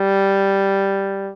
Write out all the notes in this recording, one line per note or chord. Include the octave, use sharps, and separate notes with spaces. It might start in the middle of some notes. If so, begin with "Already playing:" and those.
Already playing: G3